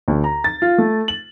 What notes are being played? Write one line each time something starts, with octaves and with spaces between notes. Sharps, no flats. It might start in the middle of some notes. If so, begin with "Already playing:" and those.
D2
A#5
A6
F4
A3
F#7